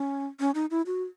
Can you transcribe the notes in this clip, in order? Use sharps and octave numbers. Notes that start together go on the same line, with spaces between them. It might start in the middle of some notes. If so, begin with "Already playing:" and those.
Already playing: C#4
C#4
D#4
E4
F#4